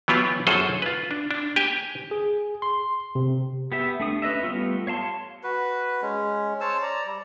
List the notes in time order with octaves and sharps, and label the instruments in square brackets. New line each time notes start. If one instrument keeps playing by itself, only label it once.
[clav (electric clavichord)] E3 F#3 B3 F4 G4
F#2 F3 F#3 G#4 A4 C5
F4 B4
D4
D4
G4 G5 G#5
[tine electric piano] G#4
C6
C3
[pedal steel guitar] B3 G4 E5
A3 D4 D#6
C#4 B4 D#5 E5
G3 A3 B3 F4
C#5 F5 A5 C6
[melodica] F#4 B4
G#3 C#4
C5 C#5 A5 E6
D5 A#5
G3